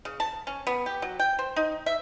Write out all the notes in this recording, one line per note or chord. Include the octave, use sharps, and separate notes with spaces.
C#3
A5
C#4
B3
G4
F#3
G5
C5
D#4
E5